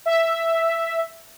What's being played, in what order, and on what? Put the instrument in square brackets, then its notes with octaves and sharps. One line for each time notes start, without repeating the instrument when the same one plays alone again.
[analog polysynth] E5